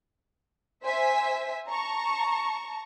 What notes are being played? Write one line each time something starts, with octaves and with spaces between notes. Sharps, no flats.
C5 E5 G#5 B6
A5 A#5 C#6